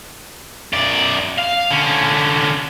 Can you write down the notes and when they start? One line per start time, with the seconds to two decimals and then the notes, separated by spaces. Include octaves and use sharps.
0.73 F#2 D5
1.38 F5
1.71 D3 C#4